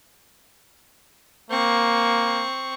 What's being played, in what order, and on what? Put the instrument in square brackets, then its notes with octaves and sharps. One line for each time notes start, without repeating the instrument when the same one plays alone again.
[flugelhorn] A#3 [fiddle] C4 C#6